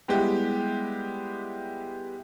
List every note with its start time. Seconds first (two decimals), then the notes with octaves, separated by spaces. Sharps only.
0.08 G3 G#3 B3 E4 G4